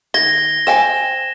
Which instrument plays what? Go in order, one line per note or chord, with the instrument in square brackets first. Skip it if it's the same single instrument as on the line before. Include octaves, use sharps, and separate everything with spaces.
[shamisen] D#3 [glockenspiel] G#6 A#6 G7
[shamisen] C5 G5 G#5 [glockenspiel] E7